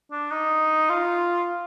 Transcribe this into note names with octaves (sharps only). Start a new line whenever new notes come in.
D4
D#4
F4